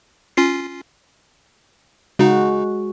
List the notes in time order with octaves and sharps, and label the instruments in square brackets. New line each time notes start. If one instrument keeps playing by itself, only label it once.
[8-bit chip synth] C#4 F4 C7
[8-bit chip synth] C#3 D#4 [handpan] G#3 F#4